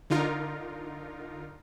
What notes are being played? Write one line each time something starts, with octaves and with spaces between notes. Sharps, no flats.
D3 D#4 F4 A#4